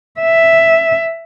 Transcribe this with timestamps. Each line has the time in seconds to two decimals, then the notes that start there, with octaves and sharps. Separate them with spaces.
0.21 E5